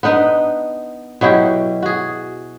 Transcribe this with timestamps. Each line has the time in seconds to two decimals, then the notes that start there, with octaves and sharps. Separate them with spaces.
0.03 B3 D4 D#4 B4
1.21 B2 F#3 E4 G4
1.82 F#4 G#4